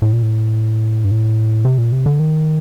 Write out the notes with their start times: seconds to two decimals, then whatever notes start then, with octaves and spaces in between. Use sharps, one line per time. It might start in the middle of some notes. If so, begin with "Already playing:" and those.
0.02 A2
0.13 A#2
0.23 A2
1.04 G2
1.11 A2
1.65 C3
1.78 A#2
1.92 C3
2.06 D3
2.20 D#3